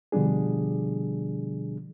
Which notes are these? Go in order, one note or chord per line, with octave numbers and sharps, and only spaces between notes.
B2 D3 F3 G3 D4 G#4